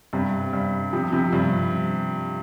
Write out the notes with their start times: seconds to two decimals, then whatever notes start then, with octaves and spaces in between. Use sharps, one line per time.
0.13 G2 C3
0.53 G2
0.93 C3 F3
1.12 C3 F3
1.33 G2 C3